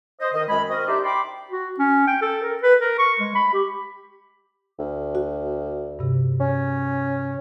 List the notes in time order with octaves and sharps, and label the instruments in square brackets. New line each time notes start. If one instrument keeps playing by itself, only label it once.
[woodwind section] C5 D#5
D#3 D#5
F#2 D#3 G#3 G#5 B5
C4 F#4 A#4 D#5
D4 D#4 G4 C5 D5 E5
G5 B5 C6 D6
[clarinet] F#4
C#4
G5
A4
A#4
B4
A#4
C#6
G#3
B5
G4
[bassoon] D2
[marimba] F#4
G2 C3
[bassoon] C#4